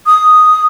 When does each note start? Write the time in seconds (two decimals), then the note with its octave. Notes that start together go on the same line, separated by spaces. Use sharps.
0.06 D#6